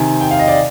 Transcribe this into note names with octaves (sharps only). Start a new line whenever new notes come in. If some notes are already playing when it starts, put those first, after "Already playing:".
Already playing: C3 D#3 G#5
G5
F5
D#5
D5